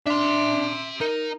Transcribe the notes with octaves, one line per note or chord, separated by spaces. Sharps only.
D4 E5 C6
D#4 A#4